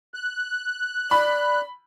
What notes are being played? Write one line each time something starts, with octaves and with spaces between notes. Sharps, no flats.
F#6
D5 B5